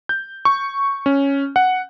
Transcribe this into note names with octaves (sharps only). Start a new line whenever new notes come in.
G6
C#6
C#4
F#5